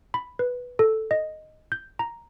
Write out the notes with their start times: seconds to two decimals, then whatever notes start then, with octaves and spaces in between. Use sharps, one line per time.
0.14 B5
0.39 B4
0.79 A4
1.11 D#5
1.72 G6
1.99 A#5